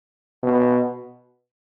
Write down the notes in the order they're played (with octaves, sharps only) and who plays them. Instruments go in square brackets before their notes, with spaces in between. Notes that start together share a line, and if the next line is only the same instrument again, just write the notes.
[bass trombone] B2